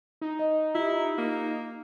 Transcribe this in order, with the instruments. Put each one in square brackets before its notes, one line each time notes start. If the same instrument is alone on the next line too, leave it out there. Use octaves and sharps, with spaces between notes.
[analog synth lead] D#4
[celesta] D#5
[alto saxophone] E4 [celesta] F4 G4
[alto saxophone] A#3